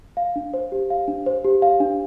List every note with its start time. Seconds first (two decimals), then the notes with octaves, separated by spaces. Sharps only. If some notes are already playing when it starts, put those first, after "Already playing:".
0.17 F5
0.36 D4
0.54 C5
0.72 G4
0.90 F5
1.08 D4
1.26 C5
1.44 G4
1.62 F5
1.80 D4